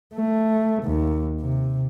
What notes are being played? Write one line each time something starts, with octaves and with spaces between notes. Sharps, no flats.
A3
D#2
C3